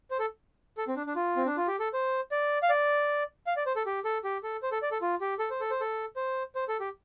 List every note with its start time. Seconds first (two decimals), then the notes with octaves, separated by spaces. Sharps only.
0.11 C5
0.19 A4
0.77 A4
0.88 C4
0.96 D4
1.06 D4
1.15 F4
1.36 C4
1.46 D4
1.57 F4
1.67 G4
1.80 A4
1.94 C5
2.32 D5
2.62 F5
2.69 D5
3.47 F5
3.57 D5
3.66 C5
3.76 A4
3.86 G4
4.05 A4
4.24 G4
4.43 A4
4.63 C5
4.72 A4
4.82 D5
4.91 A4
5.02 F4
5.21 G4
5.39 A4
5.50 C5
5.60 A4
5.71 C5
5.81 A4
6.16 C5
6.55 C5
6.68 A4
6.80 G4